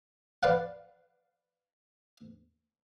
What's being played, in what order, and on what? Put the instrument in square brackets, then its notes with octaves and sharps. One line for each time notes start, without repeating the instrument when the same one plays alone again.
[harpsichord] B4 D5 F5 F#5